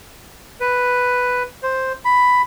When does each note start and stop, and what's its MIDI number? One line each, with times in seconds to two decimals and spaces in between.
0.60 1.43 71
1.63 1.92 72
2.05 2.42 83